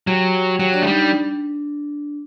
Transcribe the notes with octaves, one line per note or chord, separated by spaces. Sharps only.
F#3 G4 G5
F#3 G4 G5
D4 D5
A3
G3 D#4
D4